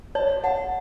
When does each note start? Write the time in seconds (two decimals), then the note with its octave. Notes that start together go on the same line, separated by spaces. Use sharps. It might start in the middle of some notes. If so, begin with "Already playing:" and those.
0.15 C#5 A5
0.44 F#5 A5